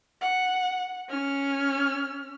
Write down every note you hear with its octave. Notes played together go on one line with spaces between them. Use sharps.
F#5
C#4 F6